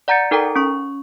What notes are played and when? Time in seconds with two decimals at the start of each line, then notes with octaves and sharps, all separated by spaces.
0.08 D5 F#5 A#5 G6 A6 C#7
0.31 D#4 A4 A#4 G5 A#5
0.56 C#4 C#6